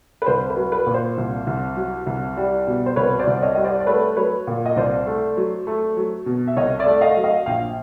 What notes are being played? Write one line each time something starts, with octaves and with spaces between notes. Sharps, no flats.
B4
C2 C5
B4
F#3
B4
A#2
C5
C2
C2
F#3
C2
G3
B2
C5
C2 B4 C#5
C5 D5
C2
D5
C#5 D#5
G3 D#5
C5 D5
D5
A3 B4 C#5
F#3 B4 C#5
A#2
D#5
C2 C5 D5
A3
F#3
A3
F#3
B2
E5
C2 C#5 D#5
D5 E5
A3
D#5 F5
F#3
D#5 F5
A#1 F5 G5